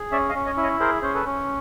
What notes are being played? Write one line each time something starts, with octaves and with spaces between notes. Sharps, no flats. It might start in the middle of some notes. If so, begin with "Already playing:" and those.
Already playing: G#4
C#4 D5 E5
D#5 F5
C#4
C#5 D#5
E4
C#5 D#5
G#4 A#4 C5
C#4 C5
A4 B4
C#4